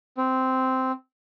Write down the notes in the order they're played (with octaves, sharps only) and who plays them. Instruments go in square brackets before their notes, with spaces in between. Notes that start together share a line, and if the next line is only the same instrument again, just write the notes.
[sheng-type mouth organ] C4